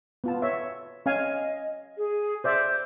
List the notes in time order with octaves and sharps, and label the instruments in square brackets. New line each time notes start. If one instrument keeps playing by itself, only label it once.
[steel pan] B3 F4 A5
C#5 E5
[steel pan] C#4 F5 G#5 [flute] D#5
[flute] G#4
[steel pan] C5 D5 E5 [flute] G6